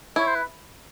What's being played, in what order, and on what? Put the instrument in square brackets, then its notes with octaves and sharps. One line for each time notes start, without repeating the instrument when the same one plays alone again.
[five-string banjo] E4 [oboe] C#5
[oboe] C5
B4